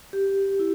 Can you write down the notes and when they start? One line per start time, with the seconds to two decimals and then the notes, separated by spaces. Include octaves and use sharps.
0.13 G4
0.59 E4